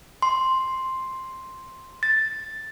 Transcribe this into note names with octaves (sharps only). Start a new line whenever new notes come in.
C6
A6